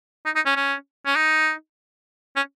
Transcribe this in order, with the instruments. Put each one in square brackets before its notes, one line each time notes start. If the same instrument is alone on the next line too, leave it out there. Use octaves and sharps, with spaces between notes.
[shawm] D#4
D#4
C#4
C#4
C#4
D#4
C#4